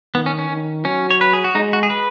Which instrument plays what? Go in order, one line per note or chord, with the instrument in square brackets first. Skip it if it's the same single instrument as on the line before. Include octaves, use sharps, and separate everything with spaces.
[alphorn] D#3 [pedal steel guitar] B3
[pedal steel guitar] C#4
C#4
[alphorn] D#3
[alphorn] F#3 [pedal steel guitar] C#4
[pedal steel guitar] C#5
B4
G#4
F#4
[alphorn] G#3 [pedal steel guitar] D#4
[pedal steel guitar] F#4
G#4
B4